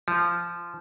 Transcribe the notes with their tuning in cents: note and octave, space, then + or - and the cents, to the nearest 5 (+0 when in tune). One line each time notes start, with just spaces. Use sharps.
F3 -20